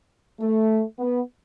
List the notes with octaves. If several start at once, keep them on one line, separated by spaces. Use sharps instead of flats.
A3
B3